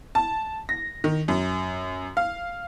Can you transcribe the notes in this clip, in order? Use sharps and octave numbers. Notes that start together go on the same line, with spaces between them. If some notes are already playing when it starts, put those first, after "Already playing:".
A5
A#6
D#3
F#2
F5